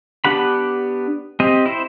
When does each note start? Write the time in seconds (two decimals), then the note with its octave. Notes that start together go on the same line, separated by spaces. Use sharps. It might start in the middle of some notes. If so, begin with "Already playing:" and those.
0.25 B3 D4 G4 F#5 B5
1.40 C4 G4 D#5
1.66 E4 C5